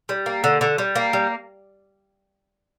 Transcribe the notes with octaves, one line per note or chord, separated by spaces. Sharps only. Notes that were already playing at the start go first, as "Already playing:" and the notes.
G3
A#3
D3
D3
G3
A#3
G3